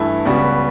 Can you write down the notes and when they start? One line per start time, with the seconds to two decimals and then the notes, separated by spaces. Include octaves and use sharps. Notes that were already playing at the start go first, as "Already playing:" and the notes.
Already playing: G2 E3 A3 E4
0.25 C#2 C#3 G3 B3 F#4